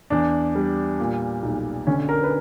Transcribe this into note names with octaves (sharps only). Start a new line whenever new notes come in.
E2 D4
G3
A#2
B1
D3 C#4
A#4
B4